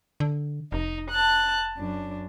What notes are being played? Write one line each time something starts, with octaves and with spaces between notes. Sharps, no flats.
D3
F1 D#4
A5 F#6
F#2 D4